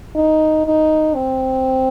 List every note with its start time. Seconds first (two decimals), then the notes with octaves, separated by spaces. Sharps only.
0.15 D#4
0.66 D#4
1.15 C4